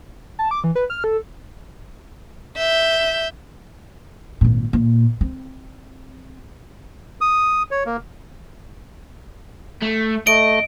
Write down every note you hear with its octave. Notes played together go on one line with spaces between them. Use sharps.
A5
D6
E3
B4
F6
A4
E5 G6
G#1 A#2
A#2
C4
D#6
C#5
A#3
A3
A3 D#5 D7